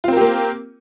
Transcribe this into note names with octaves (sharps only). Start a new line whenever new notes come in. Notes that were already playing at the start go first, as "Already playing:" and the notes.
A#3 C4 F4 G4 A#4